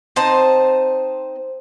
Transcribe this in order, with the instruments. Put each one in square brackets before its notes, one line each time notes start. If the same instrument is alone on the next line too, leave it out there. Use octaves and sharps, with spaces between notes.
[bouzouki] C4 D#4 C5 A5